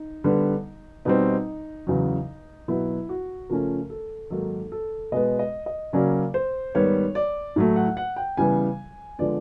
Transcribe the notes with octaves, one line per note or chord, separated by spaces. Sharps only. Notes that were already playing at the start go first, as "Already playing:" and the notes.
Already playing: D#4
D3 G3 B3
B2 G3 C4 D#4
E2 C#3 F#3
B2 F#3 B3 E4
F#4
C#3 F3 A3 C#4 A#4
A4
G#2 D#3 F#3 A#3 A4
A4
B2 G#3 B3 D#5
D#5
D#5
C#3 F#3 A#3 C#4 D5
C5
G#2 D#3 G3 B3 C#5
D5
A2 F#3 A3
F#5
F#5
G5
C#3 E3 G3 B3 G#5
D3 F3 G#3 B3 D5